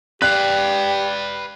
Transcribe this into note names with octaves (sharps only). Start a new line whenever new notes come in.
G4 B4 D5 F5 F#6